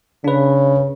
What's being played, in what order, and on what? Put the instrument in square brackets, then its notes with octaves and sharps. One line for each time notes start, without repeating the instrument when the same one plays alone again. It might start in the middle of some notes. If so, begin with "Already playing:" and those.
[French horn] C#3 [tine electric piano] D4 B4